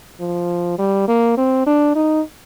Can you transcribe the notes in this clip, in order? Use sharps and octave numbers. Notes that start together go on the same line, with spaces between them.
F3
G3
A#3
C4
D4
D#4